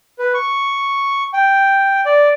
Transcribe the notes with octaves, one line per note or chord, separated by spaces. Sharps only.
B4
C#6
G5
D5